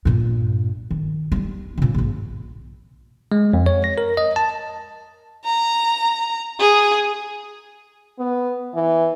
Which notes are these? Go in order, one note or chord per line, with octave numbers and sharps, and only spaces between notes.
G2 A#2
D#3
G3 D#4
A#2 C#3
A#1 G#2
G#3
F2
C#5
A#6
A#4
D#5
A5
A#5
G#4
B3
E3